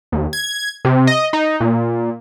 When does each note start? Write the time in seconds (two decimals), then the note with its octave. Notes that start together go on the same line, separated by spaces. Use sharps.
0.12 D#2
0.33 G#6
0.85 C3
1.07 D#5
1.33 D#4
1.60 A#2